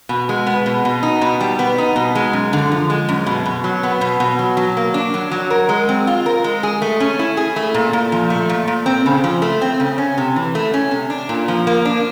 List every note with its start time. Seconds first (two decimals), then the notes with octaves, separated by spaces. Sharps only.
0.09 B2
0.29 G#3
0.46 B3
0.66 B2
0.85 B2
1.03 D#4
1.21 B2
1.40 G3
1.59 B3
1.78 D#4
1.96 B2
2.15 G#3
2.33 F#2
2.53 D3
2.72 F3
2.90 G#3
3.09 F#2
3.26 B2
3.46 B2
3.64 F#3
3.83 B3
4.01 B2
4.20 B2
4.39 F#3
4.57 F#3
4.77 A#3
4.94 D4
5.14 F#3
5.31 F#3
5.50 A#4
5.69 G#3
5.89 C4
6.07 F4
6.26 A#4
6.44 G#3
6.63 G#4
6.82 A3
7.00 C#4
7.19 E4
7.37 G#4
7.56 A3
7.74 A#2
7.93 A#2
8.12 F3
8.30 A3
8.49 A#2
8.68 A#2
8.86 C4
9.06 C#3
9.24 F3
9.42 A3
9.62 C4
9.80 C#3
9.98 C#4
10.18 C3
10.36 E3
10.55 A3
10.74 C#4
10.91 C3
11.10 D4
11.29 A#2
11.48 F3
11.67 A#3
11.85 D4